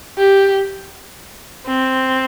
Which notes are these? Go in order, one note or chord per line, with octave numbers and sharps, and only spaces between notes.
G4
C4